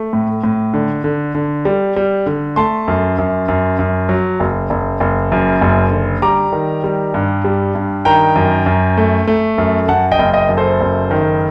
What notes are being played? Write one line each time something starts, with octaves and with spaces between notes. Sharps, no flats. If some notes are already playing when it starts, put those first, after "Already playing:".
Already playing: A3
A2
A2
D3
D3
D3
G3
G3
D3
A3 A5 C6
F#2
F#2
F#2
F#2
F#3
F#1
F#1
F#1
F#2
F#1
D3
G3 A#5 D6
D#3
G3
G2
G3
G2
D#3 G5 A#5
F#2
F#2
A3
A3
F#2
F#2 F#5 A5
D#5 G5
F#1
D#5 G5
F#2
A4 C5
F#1
D#3